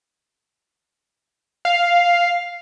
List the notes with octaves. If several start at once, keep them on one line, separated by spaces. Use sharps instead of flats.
F5